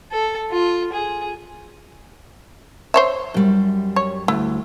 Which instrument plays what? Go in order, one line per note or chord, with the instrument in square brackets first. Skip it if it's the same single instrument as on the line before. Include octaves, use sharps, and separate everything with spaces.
[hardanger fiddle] A4
F4
G#4
[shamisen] C5 C#5 E5
[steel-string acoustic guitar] F#2 G3
[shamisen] C#5
[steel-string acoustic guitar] D2 [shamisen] E4